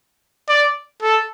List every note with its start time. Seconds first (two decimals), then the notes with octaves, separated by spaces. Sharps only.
0.49 D5
1.03 A4